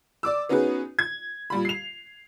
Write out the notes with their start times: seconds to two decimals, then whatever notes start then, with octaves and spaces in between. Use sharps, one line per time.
0.23 D5 D6 E6
0.49 B3 C#4 D#4 F#4 G#4 B4
0.99 G#6
1.50 A#2 G3 B5
1.65 C7 F7